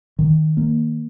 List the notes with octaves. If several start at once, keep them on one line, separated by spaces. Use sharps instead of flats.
D#3
A#3